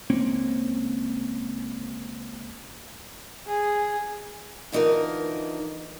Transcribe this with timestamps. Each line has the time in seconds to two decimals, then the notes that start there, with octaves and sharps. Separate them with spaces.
0.10 C#2 A#3 C4 C#4
3.47 G#4
4.72 D3 E3 D#4 F4 A#4